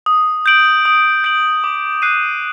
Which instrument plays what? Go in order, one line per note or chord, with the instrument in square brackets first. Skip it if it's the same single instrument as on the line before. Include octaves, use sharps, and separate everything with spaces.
[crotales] D#6
G6 D7 F#7
D#6
G6 D7 F#7
D6
F#6 C7 D#7